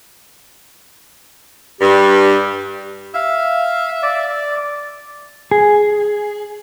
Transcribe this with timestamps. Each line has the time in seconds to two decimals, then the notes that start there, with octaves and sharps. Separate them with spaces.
1.81 G2 G4
3.15 E5 F5
4.03 D5
5.51 G#4